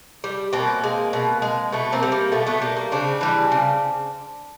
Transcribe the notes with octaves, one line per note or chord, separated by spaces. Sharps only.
G3
B2 A#3 C4
G#3
B2
G#3
B2 A3 B3
A#3 C4
G3
A#3
B2 A3 B3
A3 B3
G3 A#3
A#3
C#3 C4 D4
E3 G3
C#3